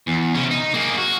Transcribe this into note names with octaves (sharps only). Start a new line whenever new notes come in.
E2
C3 C#4
D#4
A#3 G#4
F#4